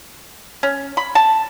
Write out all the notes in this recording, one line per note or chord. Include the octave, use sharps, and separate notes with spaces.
C#4
B5
A5